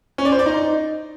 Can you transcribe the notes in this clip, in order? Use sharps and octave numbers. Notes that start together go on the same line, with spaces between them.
C#4
D5
C5
D5
D#4